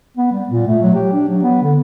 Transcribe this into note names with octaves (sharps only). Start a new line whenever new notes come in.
B3
G3
A#2
A3
F#3
G4
D4
F#3
B3
D3